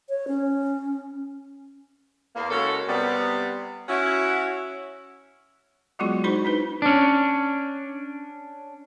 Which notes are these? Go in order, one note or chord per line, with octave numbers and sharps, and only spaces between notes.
C#5
C#4
E2 A#3
C#3 G#3 F#4 A4 A#4 C#5
C3 G3 B3
C#4 E4 F#4
F#3 G#3 B3 F4 F#4 G#4
D#4 E4 F#4 C5 C#6
D4 D#4 B4
C#4 D4